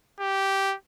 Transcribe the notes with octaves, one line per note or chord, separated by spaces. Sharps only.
G4